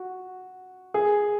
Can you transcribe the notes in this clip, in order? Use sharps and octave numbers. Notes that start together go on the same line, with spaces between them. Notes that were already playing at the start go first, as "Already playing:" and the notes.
Already playing: F#4
G#4